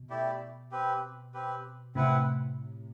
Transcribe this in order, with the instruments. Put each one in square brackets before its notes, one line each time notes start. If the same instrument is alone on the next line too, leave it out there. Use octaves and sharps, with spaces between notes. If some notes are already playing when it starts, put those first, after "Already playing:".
Already playing: [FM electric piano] B2
[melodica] A3 E4 G4 D5
C4 G4 B4
C4 G4 B4
[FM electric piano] A2 C3 [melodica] C4 E4 B4 F#5